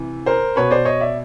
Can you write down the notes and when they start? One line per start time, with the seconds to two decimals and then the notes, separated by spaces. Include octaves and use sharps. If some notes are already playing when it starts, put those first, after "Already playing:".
Already playing: C3 E3
0.26 A#4 C5
0.56 B2 B4 C#5
0.71 C5 D5
0.85 C#5 D#5
1.00 D5 E5